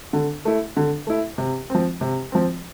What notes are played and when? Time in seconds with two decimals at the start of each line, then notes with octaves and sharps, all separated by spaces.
0.13 D3
0.45 A3 E4
0.77 D3
1.07 A3 E4
1.38 C3
1.70 F3 C4
2.01 C3
2.32 F3 C4